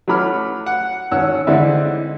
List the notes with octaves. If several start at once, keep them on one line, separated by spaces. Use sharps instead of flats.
F#3 A3 C#4 B5 D6 F6
F#5
G#1 C#4 F#5 E6
D3 G#3 C4 D#4 E4